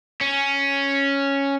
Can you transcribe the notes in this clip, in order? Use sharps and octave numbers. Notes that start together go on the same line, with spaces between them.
C#4